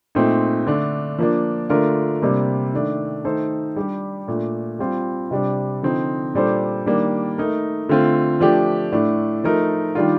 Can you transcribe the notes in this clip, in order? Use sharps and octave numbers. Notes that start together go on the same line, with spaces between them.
A#2 A3 C4 D#4
D3 A3 D4
F3 A#3 D4
D3 A3 D4 F4 A#4
C3 G3 A#3 D4
D#3 A3 D4
D#3 A3 D#4 A4 C5
G3 D4 G4
A#2 A3 D4
G3 C4 F4
C3 G3 D4
D3 F3 C4 D#4
A#2 G3 D4 A4 C5
D#3 G3 A#3 D4
A3 D#4 A#4
D3 A3 C4 F4
F3 A3 D4 G4
A2 A3 D4
F3 A3 D#4 A#4
D#3 G3 D4 F4